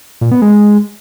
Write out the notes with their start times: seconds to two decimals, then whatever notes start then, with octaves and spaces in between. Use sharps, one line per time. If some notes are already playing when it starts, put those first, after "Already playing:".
0.21 A#2
0.31 B3
0.42 G#3